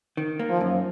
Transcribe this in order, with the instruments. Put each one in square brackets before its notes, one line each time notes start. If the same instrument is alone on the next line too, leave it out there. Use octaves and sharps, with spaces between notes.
[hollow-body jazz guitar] D#3
A#3
[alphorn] F3
[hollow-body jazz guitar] F#2